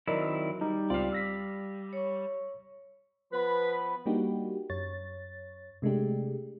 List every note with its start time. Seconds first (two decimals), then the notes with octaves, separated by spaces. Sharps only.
0.08 D#3 F#3 C4 E4 A#4 D5 D#5
0.61 G3 D#4
0.90 C#2 C4 F4 D5 F5
1.12 E6 A#6 B6
1.93 C#5 C#6
3.32 F3 B3 B4 B5
4.06 G3 A#3 D4 D#4 F#4 G4
4.70 F#2 C#5 A6
5.82 C3 G#3 A3 D4 G4